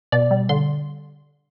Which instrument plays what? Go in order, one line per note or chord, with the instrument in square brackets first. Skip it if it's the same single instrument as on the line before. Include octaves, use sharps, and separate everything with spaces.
[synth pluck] B2 D5
G3
D3 C6